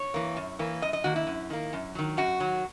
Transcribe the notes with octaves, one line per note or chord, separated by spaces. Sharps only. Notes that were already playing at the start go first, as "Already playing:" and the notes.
Already playing: C#5
E3 A#3
F#2
E3 A#3
F#2 D#5
D#5
D#3 A#3 F#4
E4
F#2
D#3 A#3
F#2
D#3 F#3
F#2 F#4
D#3 F#3